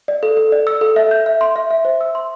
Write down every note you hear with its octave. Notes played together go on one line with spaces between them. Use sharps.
D5
A4
A4
D5
E6
A4
E5
G6
E5
C6
E5
E5
C5
E6
C6